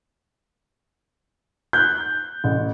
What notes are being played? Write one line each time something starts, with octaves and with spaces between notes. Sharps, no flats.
F#6 G6
A1